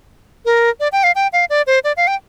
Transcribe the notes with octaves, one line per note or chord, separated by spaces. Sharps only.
A#4
D5
G5
F5
G5
F5
D5
C5
D5
F5
G5